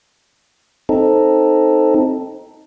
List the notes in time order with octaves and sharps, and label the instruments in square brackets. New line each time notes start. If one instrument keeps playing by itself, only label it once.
[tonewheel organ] C4 D#4 A4